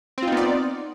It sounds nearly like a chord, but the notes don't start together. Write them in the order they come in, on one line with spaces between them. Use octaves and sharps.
C4 F4 D#4 B3 D5